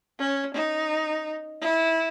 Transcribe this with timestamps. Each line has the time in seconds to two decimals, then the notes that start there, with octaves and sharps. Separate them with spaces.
0.19 C#4
0.55 D#4
1.62 E4